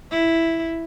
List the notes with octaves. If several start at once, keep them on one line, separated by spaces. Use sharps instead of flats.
E4